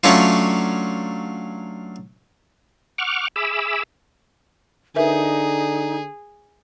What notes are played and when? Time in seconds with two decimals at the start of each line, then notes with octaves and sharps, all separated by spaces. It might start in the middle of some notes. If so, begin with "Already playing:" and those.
0.04 F#3 A3 C#4 D4 F4
2.98 F#5 C#6 D6 F6
3.36 G#4 E5 B5 D6 E6
4.96 D3 D#4 G#4 A#4 B4 E5